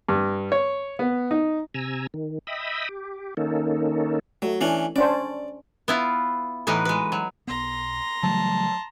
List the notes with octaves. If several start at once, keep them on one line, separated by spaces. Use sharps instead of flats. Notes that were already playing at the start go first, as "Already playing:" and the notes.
G2
C#5
B3
D#4
C3 G#5 A#5 E6
D#3
D#5 E5 G5 B5 D#6 E6
G4
D#3 A#3 C#4 D#4 A4
F#3 A3
E3 C#4 D4
C#4 D4 C5 D5
B3 E4 F4
A2 E3 D#4 F#4 B4
G#3 B4
F#3
B1 B3 A#5 C6
C#3 E3 F#3 G3 A3 A5